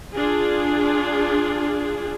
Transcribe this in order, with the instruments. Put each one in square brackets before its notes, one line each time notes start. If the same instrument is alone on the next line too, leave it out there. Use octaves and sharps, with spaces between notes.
[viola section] D4 F4 G#4